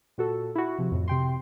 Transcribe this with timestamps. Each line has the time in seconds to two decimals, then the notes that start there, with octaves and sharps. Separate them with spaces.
0.18 A#2 F#4 A4
0.56 E4 F#4
0.79 C3 F3
0.92 F2 A2
1.08 C3 G5 C6